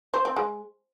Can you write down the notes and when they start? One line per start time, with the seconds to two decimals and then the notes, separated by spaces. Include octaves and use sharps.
0.14 C5
0.25 C4
0.36 G#3